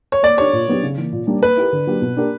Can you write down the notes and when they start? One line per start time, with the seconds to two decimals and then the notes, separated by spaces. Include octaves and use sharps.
0.12 C#5
0.23 A#3 D5
0.37 D4 G4 C#5
0.53 A#2
0.68 F#3 B3 D4 G4
0.83 C#3
0.97 E3 A#3
1.12 A#2
1.27 G3 A#3 D4
1.42 A#3 B4
1.57 E4 G4 A#4
1.73 D3
1.87 F#3 A#3 D4 G4
2.02 B2
2.17 A#3 D4 G4 A#4